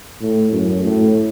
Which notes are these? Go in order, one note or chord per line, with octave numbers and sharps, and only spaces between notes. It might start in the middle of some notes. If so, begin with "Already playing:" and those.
A2
F#2
A2